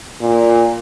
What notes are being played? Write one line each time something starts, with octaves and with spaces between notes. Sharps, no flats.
A#2